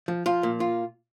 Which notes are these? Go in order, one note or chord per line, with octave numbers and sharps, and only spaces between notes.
F3
F3 F4
A#2
F4